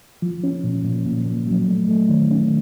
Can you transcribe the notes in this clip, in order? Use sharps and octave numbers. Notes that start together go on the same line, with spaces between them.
F3
C#4
A#2
A#2
A#2
A#2
F#3
A3
A3
D#3
C#4